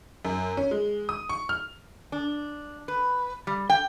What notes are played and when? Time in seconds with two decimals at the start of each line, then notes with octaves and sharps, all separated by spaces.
0.25 F#2
0.57 C#4
0.71 G#3
1.09 D#6
1.29 C#6
1.49 F6
2.12 D4
2.88 B4
3.47 G3
3.70 G5